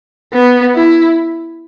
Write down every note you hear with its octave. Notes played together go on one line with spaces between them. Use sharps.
B3
E4